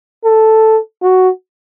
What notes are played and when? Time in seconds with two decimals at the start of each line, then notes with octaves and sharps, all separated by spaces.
0.25 A4
1.02 F#4